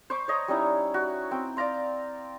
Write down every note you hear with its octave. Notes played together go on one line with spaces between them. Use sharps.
C5 B5 C#6 D6
C#5 D#5 A#5
G3 C#4 D#4 E4
F#4
C4 G5
D5 F5 A#5 C6